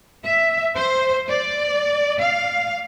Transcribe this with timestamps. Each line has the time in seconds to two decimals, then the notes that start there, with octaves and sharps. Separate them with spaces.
0.24 E5
0.76 C5
1.28 D5
2.21 F5